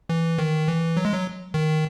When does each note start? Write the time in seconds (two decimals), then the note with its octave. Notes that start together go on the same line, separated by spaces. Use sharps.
0.09 E3
0.38 D#3
0.68 E3
0.97 F#3
1.05 G#3
1.14 F#3
1.54 D#3